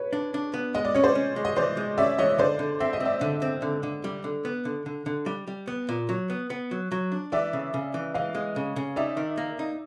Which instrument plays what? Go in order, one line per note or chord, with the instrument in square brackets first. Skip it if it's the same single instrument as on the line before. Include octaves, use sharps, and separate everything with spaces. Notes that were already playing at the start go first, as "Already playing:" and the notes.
Already playing: [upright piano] B4 C#5
[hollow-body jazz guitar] D4
D4
B3
[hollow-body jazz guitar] G#3 [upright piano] D#5
[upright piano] D5
[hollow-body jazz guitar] C#4 [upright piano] C#5
[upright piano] C5 D5
[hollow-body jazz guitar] C#4
G#3
[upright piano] D#5
[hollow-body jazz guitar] E3 [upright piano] C5 D5
[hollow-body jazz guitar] G#3
[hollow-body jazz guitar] C#4 [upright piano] D5 E5
[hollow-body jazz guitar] E3 [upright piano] C#5 D#5
[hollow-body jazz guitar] D3 [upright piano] C5 D5
[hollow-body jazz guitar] D3
[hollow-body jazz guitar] C4 [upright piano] E5
[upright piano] D#5
[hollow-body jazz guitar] C4
[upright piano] D5 E5
[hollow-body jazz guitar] D3
C4
D3
D3
G3
D3
B3
D3
D3
D3
G3
G3
B3
A#2
F#3
B3
B3
F#3
F#3
D4
[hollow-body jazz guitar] E3 [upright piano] D5 E5
[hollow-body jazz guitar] C#3
C#3
E3
[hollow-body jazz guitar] E3 [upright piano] D#5 F5
[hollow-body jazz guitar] G#3
C#3
C#3
[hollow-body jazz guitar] D#4 [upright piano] D5 E5
[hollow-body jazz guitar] D#3
A#3
D#4